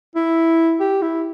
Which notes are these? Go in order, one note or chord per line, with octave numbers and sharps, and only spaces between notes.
E4
G4
E4